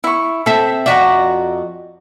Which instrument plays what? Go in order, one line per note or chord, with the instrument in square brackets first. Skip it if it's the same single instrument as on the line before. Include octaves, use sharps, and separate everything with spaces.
[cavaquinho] E4 C#6
[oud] C4 E5 [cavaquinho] A4
[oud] F2 F#4 E5 [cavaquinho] D5 F#5 A#5